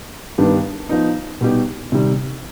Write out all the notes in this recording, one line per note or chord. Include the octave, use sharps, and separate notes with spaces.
G2 D#3 B3 D4 G4
F3 B3 D#4
B2 G3 B3 D#4 G4
C3 D#3 G3